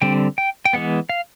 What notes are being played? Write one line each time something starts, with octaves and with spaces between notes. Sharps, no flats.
D3 G3 C4 G5
G5
G5
E3 G#3 B3 F#5
F5